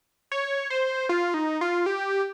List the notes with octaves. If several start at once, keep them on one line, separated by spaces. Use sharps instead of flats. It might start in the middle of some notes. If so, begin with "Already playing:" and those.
C#5
C5
F4
D#4
F4
G4